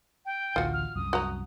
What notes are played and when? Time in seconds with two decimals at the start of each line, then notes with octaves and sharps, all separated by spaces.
0.26 G5
0.56 A1 D2 F4 F#4
0.73 F6
0.96 C2 F#2 D#6
1.13 F#4 F#5 A#5